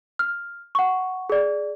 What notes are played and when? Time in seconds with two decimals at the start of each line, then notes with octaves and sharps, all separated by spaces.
0.19 F6
0.75 F#5 C#6
1.30 G#4 D5